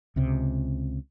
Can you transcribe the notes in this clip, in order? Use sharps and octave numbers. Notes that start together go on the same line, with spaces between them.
C#2 C3